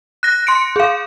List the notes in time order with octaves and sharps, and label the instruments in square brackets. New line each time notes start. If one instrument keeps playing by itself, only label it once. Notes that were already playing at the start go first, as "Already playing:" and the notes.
[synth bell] F#6 A#6
C6 C#7 D7
G#4 F5